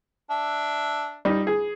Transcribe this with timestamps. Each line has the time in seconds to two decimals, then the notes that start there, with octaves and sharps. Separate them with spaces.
0.30 D4 E5
1.25 G3 D#4
1.47 G#4